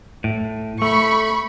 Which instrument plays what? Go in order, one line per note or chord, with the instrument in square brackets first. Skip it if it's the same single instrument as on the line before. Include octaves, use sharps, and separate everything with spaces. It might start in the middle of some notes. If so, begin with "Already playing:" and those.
[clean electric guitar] A2
[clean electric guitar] A3 [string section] B5 C#6